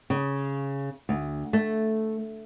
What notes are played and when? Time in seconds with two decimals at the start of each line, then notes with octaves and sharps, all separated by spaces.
0.10 C#3
1.09 D2
1.53 A3